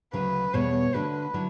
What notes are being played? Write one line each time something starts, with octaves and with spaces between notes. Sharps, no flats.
D2 C#3 F#3 B4
E2 B2 G3 B3 C#5
D3 A3 D4 F#4 B4
D3 F#3 E4